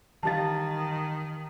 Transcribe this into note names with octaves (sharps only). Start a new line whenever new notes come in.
D#3 E3 G4 F5 A5 A6